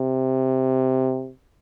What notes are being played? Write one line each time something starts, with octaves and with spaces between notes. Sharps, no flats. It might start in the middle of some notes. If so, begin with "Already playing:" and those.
Already playing: C3